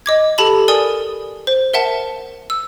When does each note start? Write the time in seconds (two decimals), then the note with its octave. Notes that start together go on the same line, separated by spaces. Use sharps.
0.06 D#5 D6 G#6
0.38 G4 A4 A5 B5 F#7
0.68 A#4 D5 G#5 D#6
1.47 C5
1.74 A#4 E5 F#5 A5
2.50 E6